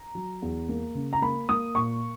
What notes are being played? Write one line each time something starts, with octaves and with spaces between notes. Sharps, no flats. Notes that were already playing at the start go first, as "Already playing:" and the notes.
Already playing: A#5
F#3
E2
A#3
C#3
A#5
A#3 B5
A#3 D#6
A#2 C#6